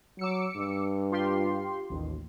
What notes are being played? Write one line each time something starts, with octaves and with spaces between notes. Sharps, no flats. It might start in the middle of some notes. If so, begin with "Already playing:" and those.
F#3 D6 E6 C#7
G2
F4 G4 C6
A1 D#2